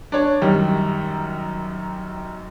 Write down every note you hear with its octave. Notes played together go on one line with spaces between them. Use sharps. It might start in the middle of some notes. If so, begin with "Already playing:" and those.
D4 C#5
F#2 D#3 G3